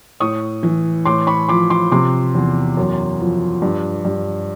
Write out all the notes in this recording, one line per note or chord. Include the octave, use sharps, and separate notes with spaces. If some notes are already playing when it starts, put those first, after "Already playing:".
A2 C#6 D#6
E3
A2 C6 D6
B5 C#6
F3 C6 D6
C6 D6
C3 C6 D6
E2
F#2
F3
G2
G2